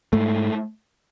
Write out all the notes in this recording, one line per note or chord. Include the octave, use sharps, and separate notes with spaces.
G#2 A3